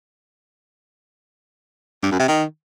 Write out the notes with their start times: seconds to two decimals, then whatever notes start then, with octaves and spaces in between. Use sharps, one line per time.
2.03 G2
2.11 F#2
2.19 C3
2.28 D#3